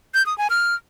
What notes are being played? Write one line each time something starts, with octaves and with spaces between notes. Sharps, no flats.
G6
D#6
G#5
F6